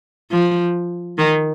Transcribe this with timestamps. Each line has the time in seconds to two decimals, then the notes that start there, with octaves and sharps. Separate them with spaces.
0.31 F3
1.18 D#3